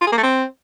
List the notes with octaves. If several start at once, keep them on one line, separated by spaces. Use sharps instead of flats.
F4
G#4
A#3
A3
C4